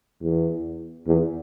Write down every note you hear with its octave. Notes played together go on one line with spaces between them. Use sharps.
E2
E2